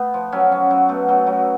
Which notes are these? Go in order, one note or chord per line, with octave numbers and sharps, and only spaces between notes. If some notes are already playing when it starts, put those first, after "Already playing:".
Already playing: A3 B3
F3
F#3 C#4
F#3 C#4
F#3
B2 A3
F#3 C#4
B2 F#3